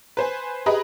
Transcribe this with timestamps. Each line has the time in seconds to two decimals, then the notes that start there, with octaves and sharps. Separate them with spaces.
0.17 B4 C5 G#5
0.66 G4 G#4 B4 D#5 A#5 B5